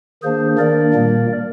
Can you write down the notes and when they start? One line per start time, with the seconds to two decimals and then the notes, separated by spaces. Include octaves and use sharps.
0.23 D#3 A#3 D4 G#4 C5
0.59 D#3 A#3 D4 A#4 D5
0.94 A#2 G3 A#3